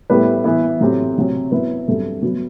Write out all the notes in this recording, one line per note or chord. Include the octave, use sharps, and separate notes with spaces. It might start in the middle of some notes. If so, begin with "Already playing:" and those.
A2 G3 B3 E4 B4
E3 B3 E4
A2 F#3 C4 G4
C3 F#3 C4
F#3 B3 E4 B4
G2 F#3 A3 C4 G4
F#3 B3 F#4